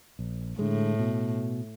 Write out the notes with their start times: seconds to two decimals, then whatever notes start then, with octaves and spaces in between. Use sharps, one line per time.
0.19 A#1
0.59 A2 D3 G#3
0.99 B2